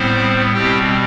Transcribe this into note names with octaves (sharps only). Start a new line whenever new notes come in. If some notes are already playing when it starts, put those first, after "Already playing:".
Already playing: A2 G3 B3 C4 C5
B2 G3 C4 G4 G5